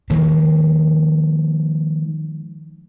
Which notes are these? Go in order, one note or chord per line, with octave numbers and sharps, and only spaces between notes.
D#3 F3 G#3 A#3